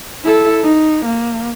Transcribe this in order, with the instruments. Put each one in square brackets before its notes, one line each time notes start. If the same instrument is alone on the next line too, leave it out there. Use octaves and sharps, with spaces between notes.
[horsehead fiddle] E4 A4
D#4
A#3